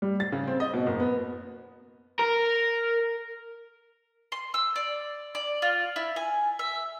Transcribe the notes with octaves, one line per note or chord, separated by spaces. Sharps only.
G3
A6
C#3
C4
D#5
B2
F#1
B3
A#4
C6
E6
D5
D5
F4
E4
G#5
E5